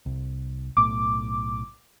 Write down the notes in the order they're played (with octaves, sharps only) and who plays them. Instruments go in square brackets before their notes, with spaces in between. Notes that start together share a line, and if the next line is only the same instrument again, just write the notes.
[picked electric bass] C2
[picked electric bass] B1 A2 [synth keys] D6